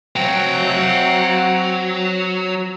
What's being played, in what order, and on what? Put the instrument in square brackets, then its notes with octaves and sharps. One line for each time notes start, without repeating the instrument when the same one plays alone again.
[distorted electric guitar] F#3 [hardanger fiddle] C4 [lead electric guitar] F#5 G5